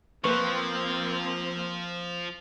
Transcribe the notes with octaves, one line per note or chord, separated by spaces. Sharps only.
F3 A#3 C4 B4 C#6